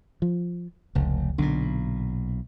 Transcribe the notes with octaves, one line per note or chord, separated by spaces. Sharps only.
F3
F1 C#2
B1 A#2 D3